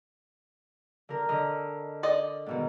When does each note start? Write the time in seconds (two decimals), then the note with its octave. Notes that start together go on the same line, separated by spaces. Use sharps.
1.09 D3 A#4
1.29 D3 D#5 F6
2.03 D5 D#5
2.46 G#2 B2 D#3